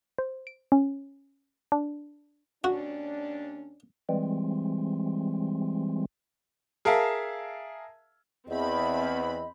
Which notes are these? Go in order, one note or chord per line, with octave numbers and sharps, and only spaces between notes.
C5
D7
C#4
D4
D#2 C#4 D4 F#4
E3 G3 G#3 C4
G#4 A#4 E5 F5 A5
E2 C4 D#5 B5